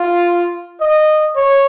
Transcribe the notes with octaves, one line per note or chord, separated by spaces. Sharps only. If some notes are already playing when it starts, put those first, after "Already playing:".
Already playing: F4
D#5
C#5